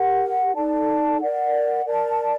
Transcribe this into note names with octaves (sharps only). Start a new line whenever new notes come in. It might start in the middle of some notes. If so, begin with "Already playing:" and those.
Already playing: G4 A#4 F#5
D#4 A4 D5 A5
A#4 D5 F#5
A#4 D5 A5